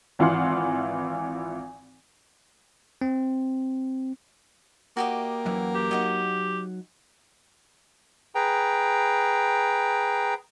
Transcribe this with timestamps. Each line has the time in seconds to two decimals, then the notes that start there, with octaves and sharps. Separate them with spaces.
0.19 G#1 E3 F4 F#5 C6 F6
3.01 C4
4.97 A#3 F#4 G4 D#5
5.46 F#2 E3 F#3
5.75 G4
5.91 F#3 D#4 D#5 F#5
8.35 G#4 B4 G5 A#5